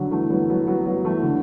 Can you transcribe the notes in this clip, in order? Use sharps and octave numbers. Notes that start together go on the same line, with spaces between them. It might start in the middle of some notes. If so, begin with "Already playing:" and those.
Already playing: D3 F#3
E3 A3
F#3 B3
F#3 B3
F#3 B3
F#3 B3
E3 A3
D3